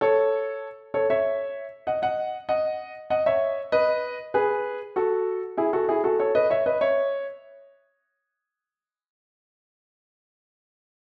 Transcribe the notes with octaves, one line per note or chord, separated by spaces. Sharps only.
A4 C#5
A4 C#5
C#5 E5
D#5 F#5
D#5 F#5
D#5 F#5
D#5 F#5
C#5 E5
B4 D#5
G#4 B4
F#4 A4
E4 G#4
F#4 A4
E4 G#4
F#4 A4
A4 C#5
B4 D#5
C#5 E5
B4 D#5
C#5 E5